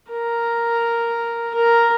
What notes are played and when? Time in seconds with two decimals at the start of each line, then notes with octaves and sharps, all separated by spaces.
0.11 A#4
1.55 A#4